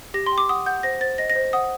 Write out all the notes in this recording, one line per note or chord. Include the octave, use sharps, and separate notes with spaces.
G4 A#6
C6
G5
D6
F#5 D#6
F#5 G6
C5 A#6
C5 A6
D#5 A#6
A#6
C5
F#5 D#6